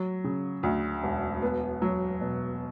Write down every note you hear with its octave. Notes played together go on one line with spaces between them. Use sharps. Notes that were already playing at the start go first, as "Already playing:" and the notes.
Already playing: F#3
C#3
D2
E1
B3
F#3
B2